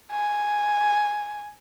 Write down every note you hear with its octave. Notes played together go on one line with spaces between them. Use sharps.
G#5